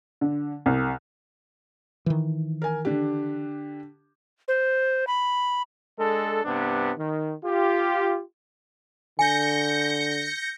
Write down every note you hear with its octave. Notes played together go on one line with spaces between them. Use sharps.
D3
C2
D#3 E3
A#4 G#5
D3 D4 G4
C5
B5
G#3 D4 A4
G2 C3 B3 D4
D#3
F4 G4
D3 G#5 G6 A#6 C#7